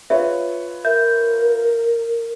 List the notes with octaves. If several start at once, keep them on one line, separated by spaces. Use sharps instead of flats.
F4 B4 C#5 E5
A#4 E5 G6